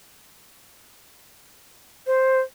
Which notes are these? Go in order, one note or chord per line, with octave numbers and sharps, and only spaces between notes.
C5